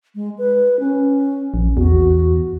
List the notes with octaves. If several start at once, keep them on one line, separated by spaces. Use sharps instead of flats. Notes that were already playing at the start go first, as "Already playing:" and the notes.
G#3
B4
C#4
A#1
E2 F#4